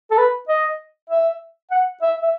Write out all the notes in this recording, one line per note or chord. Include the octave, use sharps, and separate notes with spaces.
A4
B4
D#5
E5
F#5
E5
E5